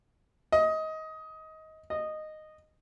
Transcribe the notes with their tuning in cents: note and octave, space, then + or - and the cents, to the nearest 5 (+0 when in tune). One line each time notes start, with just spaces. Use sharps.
D#5 +20
D#5 -10